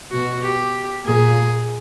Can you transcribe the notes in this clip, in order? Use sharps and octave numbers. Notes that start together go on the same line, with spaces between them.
B2 F#4
G4
A#2 G#4